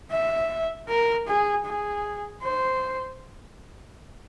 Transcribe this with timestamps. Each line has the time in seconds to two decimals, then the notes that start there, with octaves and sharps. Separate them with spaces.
0.11 E5
0.88 A#4
1.27 G#4
1.65 G#4
2.43 C5